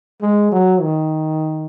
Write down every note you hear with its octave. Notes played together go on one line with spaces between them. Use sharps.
G#3
F#3
D#3